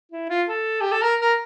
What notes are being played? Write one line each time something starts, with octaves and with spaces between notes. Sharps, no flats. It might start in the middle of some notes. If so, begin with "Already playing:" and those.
E4
F4
A4
G4
A4
A#4
A#4